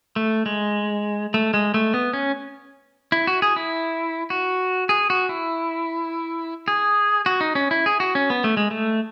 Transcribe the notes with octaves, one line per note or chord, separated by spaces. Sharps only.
A3
G#3
A3
G#3
A3
B3
C#4
E4
F#4
G#4
E4
F#4
G#4
F#4
E4
G#4
F#4
D#4
C#4
E4
G#4
F#4
C#4
B3
A3
G#3
A3